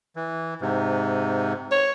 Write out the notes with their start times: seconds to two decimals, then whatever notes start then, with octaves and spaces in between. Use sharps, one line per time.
0.16 E3
0.61 G#2 C3
1.71 C#5